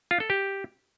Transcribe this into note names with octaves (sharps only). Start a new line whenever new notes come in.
F4
A4
G4